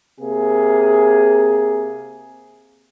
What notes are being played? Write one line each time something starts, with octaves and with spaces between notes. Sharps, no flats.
C3 A#3 G#4